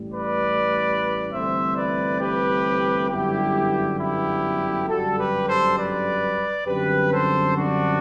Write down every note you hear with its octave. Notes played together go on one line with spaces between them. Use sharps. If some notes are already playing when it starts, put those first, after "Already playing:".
Already playing: A1 A2 G3
B4 D5
G1 G2 E3 A3 C4 C5 E5
B4 D5
G4 B4
G1 F#2 D3 G3 B3 E4 G4
E4 G4
G1 F#2 D3 G3 F#4 A4
G4 B4
A4 C5
B4 D5
F#2 D3 G3 C4 G4 B4
A4 C5
D4 F#4